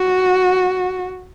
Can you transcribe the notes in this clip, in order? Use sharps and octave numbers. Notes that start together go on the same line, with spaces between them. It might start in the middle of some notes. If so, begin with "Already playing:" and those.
Already playing: F#4